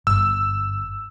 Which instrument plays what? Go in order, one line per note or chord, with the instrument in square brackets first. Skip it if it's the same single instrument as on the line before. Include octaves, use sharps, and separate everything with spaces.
[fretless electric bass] G1 [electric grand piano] E6